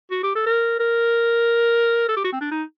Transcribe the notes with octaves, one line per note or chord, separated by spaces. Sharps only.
F#4
G4
A4
A#4
A#4
A4
G4
F#4
C4
D4
D#4